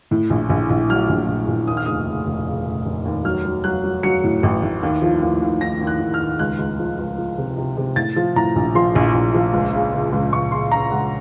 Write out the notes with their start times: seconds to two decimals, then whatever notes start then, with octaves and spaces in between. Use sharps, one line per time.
0.11 A2
0.30 A#1
0.50 A#1
0.70 A#1
0.89 F#3 F6
1.09 A#1
1.28 A#1
1.48 A#1
1.67 D#2 D#6
1.77 F6
1.86 F1 D#6
2.08 C#3
2.27 F1
2.46 C#3
2.66 F1
2.85 F1
3.05 D#2
3.25 F#3 F6
3.45 F#3
3.64 F#3 F#6
3.84 F#3
4.03 F#3 C#7
4.24 A2
4.43 A1
4.63 A2
4.83 D#2
5.02 F3
5.22 D#2
5.42 D#2
5.60 D#2 A#6
5.81 D#2
5.87 F#6
6.00 D#2
6.14 F6
6.20 D#2
6.39 C#2 F#6
6.59 C#2
6.79 F3
6.99 C#2
7.18 F3
7.38 C3
7.58 C3
7.77 C3
7.96 A2 A6
8.16 F3
8.36 A2 A#5
8.56 A#1
8.75 F3 C6
8.95 A#1
9.14 A#1
9.34 F3
9.53 C#2
9.73 C#3
9.93 C#3
10.12 C#2
10.33 C#2 C#6
10.52 C#3 C6
10.71 C#3 A#5
10.91 C#2 F#5